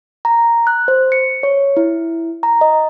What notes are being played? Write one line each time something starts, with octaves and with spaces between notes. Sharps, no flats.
A#5
F#6
C5
C#7
C#5
E4
A#5
D#5